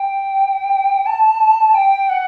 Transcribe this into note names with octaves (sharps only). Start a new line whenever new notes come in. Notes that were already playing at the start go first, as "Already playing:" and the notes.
Already playing: G5
A5
G5
F#5